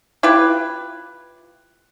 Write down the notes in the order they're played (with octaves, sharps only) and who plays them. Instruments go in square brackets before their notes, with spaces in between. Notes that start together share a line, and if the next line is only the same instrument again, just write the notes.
[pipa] E4 F4 G4 B4